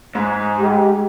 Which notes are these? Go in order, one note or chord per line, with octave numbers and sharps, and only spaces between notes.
G#2
G#3 G4